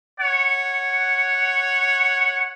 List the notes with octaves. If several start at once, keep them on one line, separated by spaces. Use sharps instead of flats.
C#5 F#5